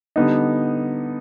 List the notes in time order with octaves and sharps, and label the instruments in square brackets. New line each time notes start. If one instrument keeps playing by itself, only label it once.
[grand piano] D3 G3 B3 D#4